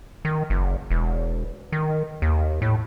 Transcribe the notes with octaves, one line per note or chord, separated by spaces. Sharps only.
D#3
F#1
E1
D#3
D#2
A2